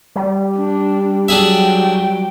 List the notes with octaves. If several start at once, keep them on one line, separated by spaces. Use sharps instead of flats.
G3
D4
F#3 D4 G#4 E5 G5